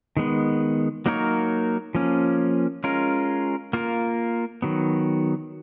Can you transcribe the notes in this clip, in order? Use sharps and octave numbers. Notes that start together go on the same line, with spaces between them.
D#3 G#3 B3
F#3 A#3 D#4 A#4 C#5
F3 A#3 C#4
G#3 C#4 F4 A#4
A#3 F4 A#4
D#3 F#3 B3